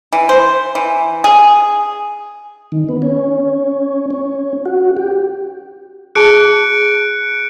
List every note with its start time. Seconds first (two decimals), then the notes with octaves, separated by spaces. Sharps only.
0.13 E3
0.29 C5
0.75 E3
1.24 G#4
2.72 D#3
2.89 B3
3.02 C#4
4.11 C#4
4.66 F#4
4.97 G4
6.15 F#4 G#4 A5 F#6 C#7 D7